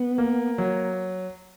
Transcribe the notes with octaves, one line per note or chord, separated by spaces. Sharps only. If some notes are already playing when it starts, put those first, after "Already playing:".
Already playing: B3
A#3
F#3